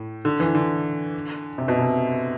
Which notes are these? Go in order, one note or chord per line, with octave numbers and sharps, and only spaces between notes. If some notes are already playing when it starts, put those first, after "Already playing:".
Already playing: A2
D3
E3
D3
C3
B2
C3